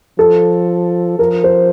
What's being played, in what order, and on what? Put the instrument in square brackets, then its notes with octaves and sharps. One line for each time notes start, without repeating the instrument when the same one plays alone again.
[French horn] F3 [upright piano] A4
[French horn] F3 [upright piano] A#4
[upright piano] C5